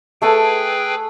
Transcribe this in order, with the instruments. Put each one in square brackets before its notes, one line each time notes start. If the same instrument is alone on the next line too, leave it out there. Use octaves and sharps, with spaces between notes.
[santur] A3 A4 G#5 [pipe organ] G#4 B4 G5